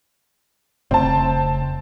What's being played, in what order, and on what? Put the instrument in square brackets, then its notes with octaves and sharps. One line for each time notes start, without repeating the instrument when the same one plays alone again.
[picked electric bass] F1 C#3 A3 [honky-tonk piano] C4 A5